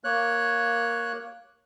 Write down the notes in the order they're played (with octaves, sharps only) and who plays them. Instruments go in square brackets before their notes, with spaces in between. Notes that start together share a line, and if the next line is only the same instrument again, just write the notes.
[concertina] A#3 C#5 F#6